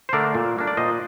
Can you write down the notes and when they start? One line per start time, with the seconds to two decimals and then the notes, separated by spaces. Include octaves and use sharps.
0.09 C5
0.13 D3 A3 D4 A#4 D5
0.35 A#2
0.57 G3 A#3 D4
0.67 D5
0.77 A#2 C5 D#5